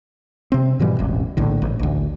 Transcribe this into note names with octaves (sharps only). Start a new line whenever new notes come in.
C3 C4
G#2 B2 E3 G3
E1 A1
A#1 A2 D3
A1
A1 D2